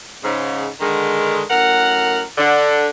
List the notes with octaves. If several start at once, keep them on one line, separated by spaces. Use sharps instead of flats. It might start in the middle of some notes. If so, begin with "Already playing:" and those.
G#2 C#3
D3 D#3 G#3
F#2 A2 A#4 F#5
D3